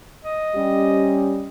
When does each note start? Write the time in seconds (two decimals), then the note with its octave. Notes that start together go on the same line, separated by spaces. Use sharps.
0.25 D#5
0.56 G3 C#4 G4